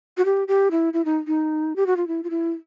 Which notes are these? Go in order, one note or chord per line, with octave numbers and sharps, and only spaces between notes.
F#4
G4
G4
E4
E4
D#4
D#4
G4
F#4
F4
E4
F4
E4